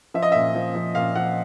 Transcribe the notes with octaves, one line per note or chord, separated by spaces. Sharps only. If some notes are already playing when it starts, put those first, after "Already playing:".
F3 E5
D#5
A#2 E5
F3
F3
A#2 F5
F3 F#5